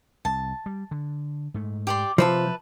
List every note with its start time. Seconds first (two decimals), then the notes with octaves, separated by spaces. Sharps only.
0.25 C2 A5
0.66 G3
0.91 D3
1.54 G#2 A3
1.87 G4 D5 C6
2.18 C3 F3 B4 E5 A5